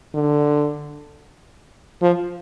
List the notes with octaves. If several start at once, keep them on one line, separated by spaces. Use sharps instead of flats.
D3
F3